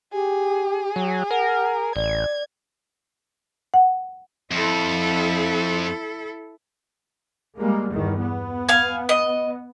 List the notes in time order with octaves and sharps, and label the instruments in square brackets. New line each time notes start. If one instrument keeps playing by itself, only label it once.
[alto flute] G4 [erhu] G#4
[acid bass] F#3
[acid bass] A#4 [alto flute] F#5
[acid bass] A1 [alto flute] D5 [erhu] G#6
[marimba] F#5
[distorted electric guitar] F2 [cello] E4 A4
[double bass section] G3 G#3 A#3
E2 G2 D#3
B3
[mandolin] F5 G#5
D#5